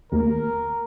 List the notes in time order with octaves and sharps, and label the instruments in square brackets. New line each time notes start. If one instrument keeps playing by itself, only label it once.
[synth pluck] D#2 [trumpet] A#4